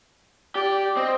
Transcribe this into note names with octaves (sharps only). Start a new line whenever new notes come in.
G4 D5
C4 D#5